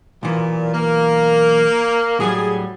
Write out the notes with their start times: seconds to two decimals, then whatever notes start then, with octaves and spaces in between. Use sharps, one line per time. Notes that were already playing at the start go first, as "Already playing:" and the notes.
0.23 B1 A#2 E3
0.73 A#3
2.20 A2 F#3 G3 G#4